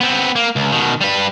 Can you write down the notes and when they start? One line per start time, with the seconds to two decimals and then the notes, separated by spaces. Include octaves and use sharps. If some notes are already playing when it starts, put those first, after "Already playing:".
0.01 B3 C4
0.36 A#3
0.56 C#2
0.72 B2 D#3
1.01 G3 B4